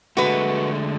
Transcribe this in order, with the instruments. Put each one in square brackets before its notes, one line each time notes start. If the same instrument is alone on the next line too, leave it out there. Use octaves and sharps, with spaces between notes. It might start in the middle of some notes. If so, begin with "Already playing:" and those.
[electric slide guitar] D3 G#3 A3 [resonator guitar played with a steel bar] F#4 B4